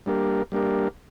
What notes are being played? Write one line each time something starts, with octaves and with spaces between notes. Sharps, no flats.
G3 A#3 D4 G4 A#4
G3 A#3 D4 G4 A#4